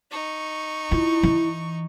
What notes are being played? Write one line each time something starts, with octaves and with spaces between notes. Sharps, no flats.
D#4 C#6
E4 F4
E3